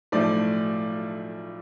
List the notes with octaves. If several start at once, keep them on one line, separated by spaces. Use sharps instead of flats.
B1 A2 F3 A3 D5